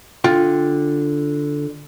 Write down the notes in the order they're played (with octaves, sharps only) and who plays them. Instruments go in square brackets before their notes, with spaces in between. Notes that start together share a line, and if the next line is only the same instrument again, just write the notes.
[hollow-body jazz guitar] D3 F4 G5